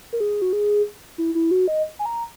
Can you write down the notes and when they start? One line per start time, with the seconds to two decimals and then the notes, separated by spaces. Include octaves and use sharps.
0.13 A#4
0.20 G#4
0.42 F#4
0.53 G#4
1.18 E4
1.35 E4
1.51 F#4
1.68 D#5
1.99 G#5
2.06 A#5